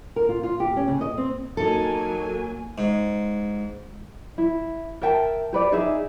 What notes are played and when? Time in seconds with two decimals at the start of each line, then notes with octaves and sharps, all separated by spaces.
0.16 A#4
0.29 F4
0.43 F4
0.60 G4
0.77 C#4
0.88 C#3
1.01 D#5
1.18 C4
1.57 F#3 A#3 D#4 A4 G#5
2.78 G#2
4.38 E4
5.01 A#4 E5 G5 A5
5.53 G4 B4 D5
5.72 D#4 G#4 D5 E5